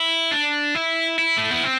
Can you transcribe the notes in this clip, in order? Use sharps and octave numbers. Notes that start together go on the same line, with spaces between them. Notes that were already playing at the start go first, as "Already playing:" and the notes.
Already playing: E4
D4
E4
E4
A3
B3
C4